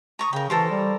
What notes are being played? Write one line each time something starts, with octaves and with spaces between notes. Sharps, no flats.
A#5 C#6 D#6
C#3 A#4 G5
E3 A4 A#4 C5
G3